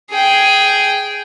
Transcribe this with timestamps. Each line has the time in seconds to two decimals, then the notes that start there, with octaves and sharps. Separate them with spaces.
0.10 G#4 G5